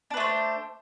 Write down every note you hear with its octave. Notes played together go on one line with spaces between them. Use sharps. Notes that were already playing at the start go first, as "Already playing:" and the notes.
A3 D4 B4 C5